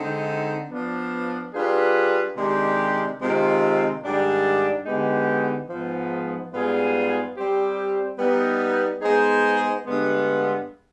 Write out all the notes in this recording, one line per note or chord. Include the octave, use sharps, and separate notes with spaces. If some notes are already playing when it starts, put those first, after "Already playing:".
Already playing: D3 G#3 C4 D#4
F3 B3 D4
G3 D4 F4 G#4 B4
C3 D#3 G#3 D4 G4
C3 D#3 G#3 C4 F4
G#2 D#3 G3 D4
D3 G#3 B3 D#4 G4
G#2 F3 B3
G#2 G3 B3 F4 G#4
G3 C4 G4 C5
G3 B3 D#4
G#3 B3 D#4 G#4 C5
G2 D3 G#3 B3